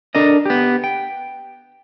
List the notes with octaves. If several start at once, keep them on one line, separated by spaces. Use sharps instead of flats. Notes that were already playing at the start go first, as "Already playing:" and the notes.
D4 A4 A#4 D#5
B3 G4
G5